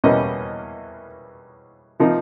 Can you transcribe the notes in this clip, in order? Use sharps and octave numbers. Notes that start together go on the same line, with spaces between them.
E2 B2 G3 A#3 C#4 D#5
C3 F3 A#3 D#4